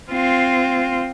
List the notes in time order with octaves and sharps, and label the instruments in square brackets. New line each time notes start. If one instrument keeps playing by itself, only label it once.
[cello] C4 F4